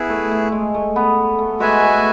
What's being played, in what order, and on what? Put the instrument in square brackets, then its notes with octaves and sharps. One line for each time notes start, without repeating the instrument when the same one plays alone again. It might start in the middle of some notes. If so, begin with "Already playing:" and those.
Already playing: [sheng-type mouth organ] B3 E4 G#4
[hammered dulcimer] A3
A3
G#3
A3
B3
A3
[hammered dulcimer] G#3 [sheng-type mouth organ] F#4 B4 E5 G#5
[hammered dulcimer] A3